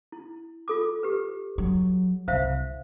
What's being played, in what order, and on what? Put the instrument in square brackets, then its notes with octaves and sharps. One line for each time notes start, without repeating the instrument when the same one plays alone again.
[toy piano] E4
F4 A4 D6
G4 B4
[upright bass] F#3
[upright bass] C2 [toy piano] C5 E5 F5